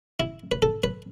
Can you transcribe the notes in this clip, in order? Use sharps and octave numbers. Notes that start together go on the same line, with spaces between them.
E4
B4
A4
B4